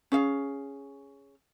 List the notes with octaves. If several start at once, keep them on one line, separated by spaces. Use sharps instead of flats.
C#4 G#4 F5